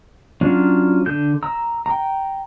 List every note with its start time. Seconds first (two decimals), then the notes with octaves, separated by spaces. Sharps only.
0.41 F#3 C#4 D4 F4
1.06 D3 G6
1.43 A#5 E6
1.86 G5 A#5